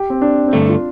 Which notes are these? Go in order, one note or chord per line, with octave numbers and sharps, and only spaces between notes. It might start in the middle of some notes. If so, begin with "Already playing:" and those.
Already playing: G4
C4
D4
C4
G2 D3 A3 D4
F4